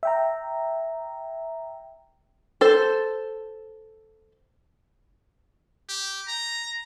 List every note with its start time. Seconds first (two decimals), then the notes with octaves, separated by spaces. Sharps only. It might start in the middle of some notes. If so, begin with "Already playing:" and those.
0.03 E5 G5 A#5
2.61 A4 C5
5.89 G4
6.28 A#5